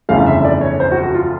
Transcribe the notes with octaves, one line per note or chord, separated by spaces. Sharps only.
G1 F2 C#3 E3 A3 F5
E5
D5
C#5
C5
F#4
F#4
F4